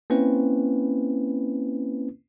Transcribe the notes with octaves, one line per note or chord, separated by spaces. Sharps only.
A#3 C4 C#4 E4 B4